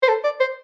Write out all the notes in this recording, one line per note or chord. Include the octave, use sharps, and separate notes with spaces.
C5
A4
D5
C5